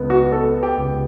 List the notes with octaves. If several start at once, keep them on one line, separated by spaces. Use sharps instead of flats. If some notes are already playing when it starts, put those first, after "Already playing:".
Already playing: C#2 B3
F#4
B3 A4
G4
C#2